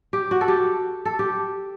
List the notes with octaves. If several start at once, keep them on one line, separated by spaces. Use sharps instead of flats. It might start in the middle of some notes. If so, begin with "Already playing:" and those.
G4
F#4
A4
G4
A4
G4